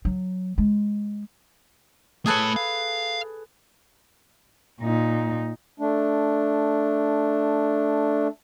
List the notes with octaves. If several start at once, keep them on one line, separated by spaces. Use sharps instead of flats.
F#3
G#3
A3 G#4 A4 B4 C#5
F5
A#2 D#4
A3 D4